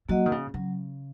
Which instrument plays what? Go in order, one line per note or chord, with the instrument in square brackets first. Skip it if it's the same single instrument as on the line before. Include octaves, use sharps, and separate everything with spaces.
[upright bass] F#3 [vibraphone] A#3 F#4 D#5 F#5
[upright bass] D#3
C#3
[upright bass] C#3 [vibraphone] F#3